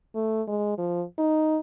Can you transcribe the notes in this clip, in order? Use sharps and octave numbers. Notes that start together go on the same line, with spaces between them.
A3
G#3
F3
D#4